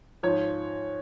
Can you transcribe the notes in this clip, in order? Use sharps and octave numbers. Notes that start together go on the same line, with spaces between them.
G#2 F3 C#5